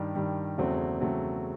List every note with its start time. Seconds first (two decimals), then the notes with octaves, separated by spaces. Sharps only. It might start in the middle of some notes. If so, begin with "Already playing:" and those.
Already playing: G2 D#3 G3
0.15 G2 D#3 G3
0.58 E2 C#3 F#3 A3 C4
1.00 E2 C#3 F#3 A3 C4